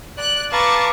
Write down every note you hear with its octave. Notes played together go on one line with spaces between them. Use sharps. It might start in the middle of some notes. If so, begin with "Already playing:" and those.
D5 F#6
B4 F5 A5 A#5 C#6 D6